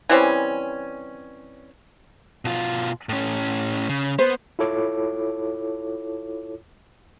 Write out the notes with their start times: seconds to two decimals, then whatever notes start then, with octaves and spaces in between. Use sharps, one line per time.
0.09 E3 G3 C4 C#4
2.45 B2 F4
3.09 A2 C#4
3.89 C#3
4.19 B3 C5
4.59 E4 F4 A4 C#5 D6